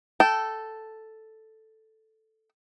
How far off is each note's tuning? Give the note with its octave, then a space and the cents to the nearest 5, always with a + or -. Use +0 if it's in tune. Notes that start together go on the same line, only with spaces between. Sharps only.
A4 +0 G5 -20